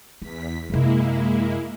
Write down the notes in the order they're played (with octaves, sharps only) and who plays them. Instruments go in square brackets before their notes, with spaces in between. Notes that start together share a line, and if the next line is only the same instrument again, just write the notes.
[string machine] E2 B6 [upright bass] B3
[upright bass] F#2 C3 [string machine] G#3 A#3 E4